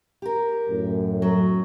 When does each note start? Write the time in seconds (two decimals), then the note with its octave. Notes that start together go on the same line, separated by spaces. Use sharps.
0.22 G4 A#4
0.68 F#2 A2
1.22 F#3